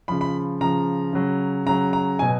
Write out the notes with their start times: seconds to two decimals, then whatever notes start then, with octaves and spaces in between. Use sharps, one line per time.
0.08 C#3 F3 B5
0.21 B5
0.61 C#3 F3 A#5
1.13 C#3 F#3
1.66 C#3 F#3 A#5
1.93 A#5
2.19 B2 F#3 G#5